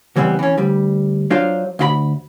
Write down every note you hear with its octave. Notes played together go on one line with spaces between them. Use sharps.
C#2 E3 G3 B3 C4
E3 C#4
D2 G3
F#3 D4 F4 C5 F5
D2 F4 B5